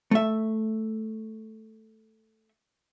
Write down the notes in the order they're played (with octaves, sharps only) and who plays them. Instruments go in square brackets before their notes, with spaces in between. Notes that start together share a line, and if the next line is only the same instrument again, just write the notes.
[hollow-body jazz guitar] A3 E5